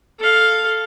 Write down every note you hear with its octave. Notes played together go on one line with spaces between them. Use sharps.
A4 F5